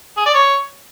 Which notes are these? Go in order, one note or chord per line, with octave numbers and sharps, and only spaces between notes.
G#4
D5
C#5